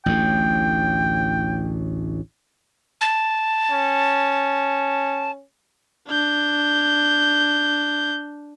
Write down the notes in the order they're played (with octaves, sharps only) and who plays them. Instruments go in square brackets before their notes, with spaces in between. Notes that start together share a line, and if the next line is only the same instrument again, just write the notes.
[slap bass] A1 D2 A2 [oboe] G5
[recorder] A5
[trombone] C#4
[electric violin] D4 G6